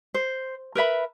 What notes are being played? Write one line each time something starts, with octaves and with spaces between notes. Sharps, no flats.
C5
A#4 B4 E5 B5